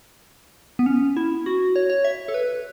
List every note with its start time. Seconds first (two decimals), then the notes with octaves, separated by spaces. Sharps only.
0.79 B3
0.86 C#4
1.17 E4
1.46 F#4
1.76 C#5
1.90 C#5
2.05 E5
2.28 A4
2.34 B4